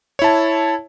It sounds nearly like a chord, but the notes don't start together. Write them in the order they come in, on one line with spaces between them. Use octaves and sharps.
C#5 E4 A5